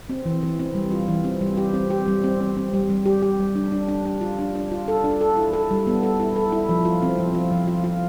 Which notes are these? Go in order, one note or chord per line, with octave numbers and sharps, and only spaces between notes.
C4
E3
E3
C4
G3
F4
E3
C4
G3
G4
C4
G4
G3
C4
C4
C4
G3
G3
G4
G4
G3
D4
D4
D4
D4
F4
D4
D4
F4
A4
D4
A4
E4
A4
G3
B3
A4
E4
A4
E4
F3
F4
C4
F3
F4
F3
F4
F4